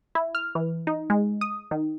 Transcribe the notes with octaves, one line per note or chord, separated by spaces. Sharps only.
E4
F6
E3
D#4
G#3
D#6
D#3